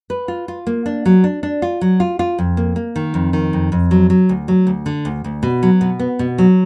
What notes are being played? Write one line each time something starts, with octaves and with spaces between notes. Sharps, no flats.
B4
F4
F4
A#3
D4
F#3
D4
D4
F4
F#3
F4
F4
F2
A#3
A#3
D#3
F2
D#3
F2
F2
F#3
F#3
D2
F#3
D2
D3
D2
D2
B2
F#3
B2
B3
B2
F#3